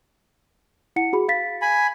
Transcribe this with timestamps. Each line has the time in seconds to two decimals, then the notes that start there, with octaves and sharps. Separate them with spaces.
0.96 E4 F#5 C#7
1.13 F#4 G#4 B5
1.28 F5 A6 B6
1.62 G#5 B5